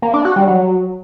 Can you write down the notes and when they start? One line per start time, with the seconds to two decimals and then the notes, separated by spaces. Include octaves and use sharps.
0.02 A#3
0.14 D4
0.25 F#4
0.36 G3
0.47 F#3